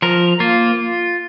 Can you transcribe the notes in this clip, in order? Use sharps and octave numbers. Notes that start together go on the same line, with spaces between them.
F3 A#4
A#3 F4